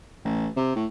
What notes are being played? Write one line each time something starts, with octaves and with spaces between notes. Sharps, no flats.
A1
C3
A2